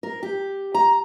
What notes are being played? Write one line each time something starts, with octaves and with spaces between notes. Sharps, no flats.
A#4
G4
A#5